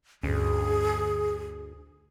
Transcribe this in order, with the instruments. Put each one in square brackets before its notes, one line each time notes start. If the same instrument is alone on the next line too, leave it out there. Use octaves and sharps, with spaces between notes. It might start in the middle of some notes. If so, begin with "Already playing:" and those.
[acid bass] D2 [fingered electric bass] G2 C#4 [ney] G#4